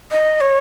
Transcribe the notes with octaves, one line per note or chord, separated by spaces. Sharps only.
D#5
C#5